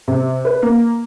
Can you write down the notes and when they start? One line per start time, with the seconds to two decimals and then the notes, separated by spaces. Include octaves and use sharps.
0.08 C3
0.45 B4
0.62 A#3